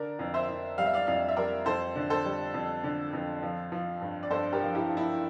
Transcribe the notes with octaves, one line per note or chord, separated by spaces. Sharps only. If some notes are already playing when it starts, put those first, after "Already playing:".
Already playing: D3 A#4 D5
F2
C5 E5
F2
G3 F5
E5
D5 F5
F2 D5 F5
E5
G3 A#4 D5
F2 A4 C5
D3
A4 C5
G3
F2
D3
F2
F3
F3
G2
D5
G2 A4 C5
G4 A#4
F3
E4 G4
F3
E4